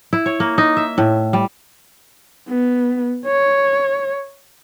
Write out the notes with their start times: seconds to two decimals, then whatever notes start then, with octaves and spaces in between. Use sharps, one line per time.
0.13 E4
0.26 C#5
0.40 A#3
0.58 D#4
0.77 E5
0.98 A2
1.33 G3
2.48 B3
3.25 C#5